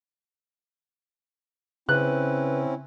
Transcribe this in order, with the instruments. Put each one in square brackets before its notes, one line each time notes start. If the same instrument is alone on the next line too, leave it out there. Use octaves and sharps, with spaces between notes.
[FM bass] C#3 [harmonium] C4 C#4 E4 [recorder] B4 [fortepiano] F#6